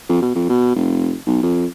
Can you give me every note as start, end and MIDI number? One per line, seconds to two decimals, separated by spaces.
0.09 0.22 41
0.22 0.32 47
0.35 0.49 41
0.49 0.72 47
0.75 1.14 29
1.26 1.41 35
1.43 1.66 41